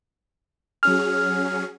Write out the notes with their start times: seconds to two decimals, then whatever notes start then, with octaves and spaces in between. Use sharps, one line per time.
0.83 F#3 C#4 G#4 F6